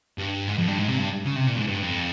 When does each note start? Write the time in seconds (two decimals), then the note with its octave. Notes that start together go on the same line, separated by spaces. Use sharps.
0.18 G2
0.47 G#2
0.58 F2
0.68 G2
0.78 G#2
0.88 C3
0.98 G2
1.25 C#3
1.36 C3
1.47 A#2
1.56 G#2
1.67 G2
1.82 F2